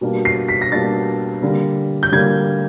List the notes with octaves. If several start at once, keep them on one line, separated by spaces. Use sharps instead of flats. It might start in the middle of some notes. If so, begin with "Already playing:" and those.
B2 G3 A#3 D4
C7
B6
A#6
B2 G3 A#3 D4 A6
D3 G3 A#3
G6
D3 G3 A#3 G#6